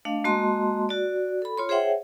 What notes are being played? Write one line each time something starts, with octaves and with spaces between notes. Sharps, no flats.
A3 D4 D#5 F5
G#3 A#3 F#4 D#5 A5 C6
F#4 D5
A4 B5
F4 C#5 C6
G#4 C5 C#5 E5 F#5 G5